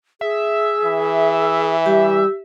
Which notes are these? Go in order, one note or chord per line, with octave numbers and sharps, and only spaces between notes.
G#4 E5
E3
G3 G4